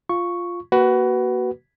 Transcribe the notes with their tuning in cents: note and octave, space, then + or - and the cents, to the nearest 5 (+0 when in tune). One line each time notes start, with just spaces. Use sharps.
F4 +0 C#6 +0
A#3 +0 F#4 +20 B4 +0